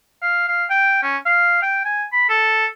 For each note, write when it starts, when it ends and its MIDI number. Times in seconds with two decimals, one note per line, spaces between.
0.22 0.46 77
0.48 0.65 77
0.70 1.01 79
1.03 1.17 61
1.26 1.62 77
1.63 1.81 79
1.85 2.04 80
2.12 2.26 83
2.29 2.67 69